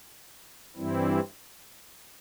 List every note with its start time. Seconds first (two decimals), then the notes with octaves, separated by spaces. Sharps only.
0.76 G2 E3 G3 C4 E4